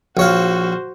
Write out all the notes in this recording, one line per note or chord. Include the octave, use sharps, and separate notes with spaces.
A#1 F#4 C5 C#5 F5